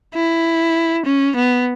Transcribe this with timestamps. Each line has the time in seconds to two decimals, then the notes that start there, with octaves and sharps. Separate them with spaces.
0.14 E4
1.05 C#4
1.36 B3